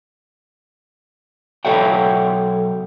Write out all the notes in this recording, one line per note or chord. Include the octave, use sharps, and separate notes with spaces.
B1 A4 C#5 E5 F#5 G5